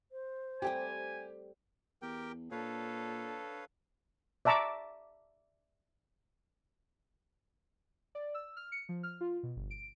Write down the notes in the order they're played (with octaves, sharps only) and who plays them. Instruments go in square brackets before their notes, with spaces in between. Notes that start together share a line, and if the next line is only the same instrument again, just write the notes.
[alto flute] C5
[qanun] G3 A3 C4 [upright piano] G4 G5 [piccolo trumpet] G#5
[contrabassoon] E2 [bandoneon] G4 A#4 G5
[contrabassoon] A#2 [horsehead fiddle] D4 A4 [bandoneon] B4 C#5 F5
[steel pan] D5 E5 A5 A#5 C#6 D6
[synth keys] D5
E6
F6
C#7
F3
F6
F4
B2
G1
D7